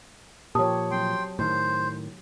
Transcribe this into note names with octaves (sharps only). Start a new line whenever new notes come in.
A#2 F3 G4 C#5 A5 D#6
F#3 C4 G5 C6
A2 D#3 C5